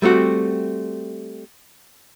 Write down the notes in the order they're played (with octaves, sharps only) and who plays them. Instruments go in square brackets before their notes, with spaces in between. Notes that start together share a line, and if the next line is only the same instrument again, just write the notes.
[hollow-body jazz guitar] G3 A3 C4 F#4